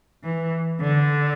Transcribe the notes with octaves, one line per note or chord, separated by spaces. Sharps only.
E3
D3